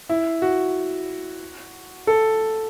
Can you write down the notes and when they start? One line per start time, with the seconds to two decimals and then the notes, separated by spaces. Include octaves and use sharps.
0.09 E4
0.42 F#4
2.07 A4